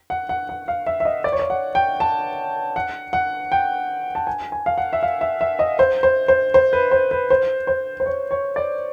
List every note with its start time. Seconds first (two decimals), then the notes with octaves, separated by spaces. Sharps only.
0.10 F#5
0.29 F#5
0.49 F#5
0.68 F5
0.87 E5
1.00 E5
1.05 D#5
1.24 D5
1.32 C#5
1.39 D5
1.50 F#5
1.75 G5
2.00 A5
2.76 F#5
3.13 F#5
3.52 G5
4.15 A5
4.27 G#5
4.52 G#5
4.66 F5
4.78 F#5
4.93 E5
5.03 F5
5.21 E5
5.41 E5
5.59 D#5
5.79 C5
6.03 C5
6.28 C5
6.54 C5
6.73 B4
6.91 C5
7.11 B4
7.30 C5
7.67 C5
8.00 C5
8.06 C#5
8.31 C#5
8.56 D5